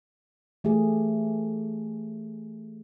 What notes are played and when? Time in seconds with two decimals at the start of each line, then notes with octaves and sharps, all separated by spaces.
0.64 E3 A3 G4 G#4